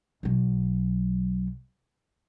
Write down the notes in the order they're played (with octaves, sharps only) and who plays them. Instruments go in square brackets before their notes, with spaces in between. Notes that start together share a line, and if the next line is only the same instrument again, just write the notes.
[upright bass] B1 F#3